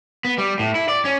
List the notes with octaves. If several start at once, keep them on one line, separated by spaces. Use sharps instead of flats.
B3
G3
A2
E4
D5
C#4